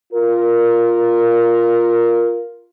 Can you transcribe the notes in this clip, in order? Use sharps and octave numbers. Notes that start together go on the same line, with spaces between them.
F4 A#4